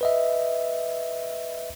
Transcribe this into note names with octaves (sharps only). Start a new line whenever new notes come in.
B4 D#5 E5